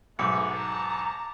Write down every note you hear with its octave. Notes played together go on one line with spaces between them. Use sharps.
B1 G#2 A3 B3 D6 C#7
A5 A#5